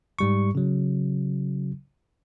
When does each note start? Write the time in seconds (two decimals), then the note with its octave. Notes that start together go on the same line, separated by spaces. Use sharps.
0.19 G#2 G3 C#6
0.55 C#3 F#3